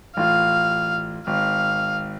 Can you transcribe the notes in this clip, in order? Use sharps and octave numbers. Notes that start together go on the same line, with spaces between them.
A1 F4 F5
G#1 F5